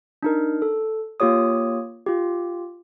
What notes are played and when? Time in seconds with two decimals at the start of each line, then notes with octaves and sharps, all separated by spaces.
0.23 D4 D#4 A#4
0.62 A4
1.20 A#3 F4 G4 C#5 D#6
2.06 F4 G4